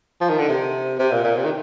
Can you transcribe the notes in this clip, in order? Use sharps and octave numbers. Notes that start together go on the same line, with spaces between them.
F3
D#3
D3
C3
C3
A#2
A#2
C3
D#3